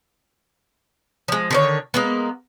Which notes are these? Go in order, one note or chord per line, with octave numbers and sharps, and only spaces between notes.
F3 G#3
D3 D#3 C#5
G#3 A#3 B3